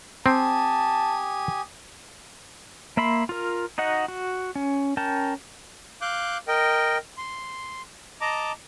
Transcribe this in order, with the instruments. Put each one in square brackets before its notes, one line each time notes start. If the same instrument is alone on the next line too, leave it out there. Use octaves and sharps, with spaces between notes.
[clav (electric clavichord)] C4 [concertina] G4 G#5 D#6 [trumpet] A5
[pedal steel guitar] A#3 E5 B5 C6
F4 A#4
D#4 F#4 D#5 F#5
F#4
C#4
C#4 A#4 G5 A5
[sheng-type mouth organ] F5 D6 F#6 G6
A#4 D#5 G5
C6
D#5 A5 A#5 D6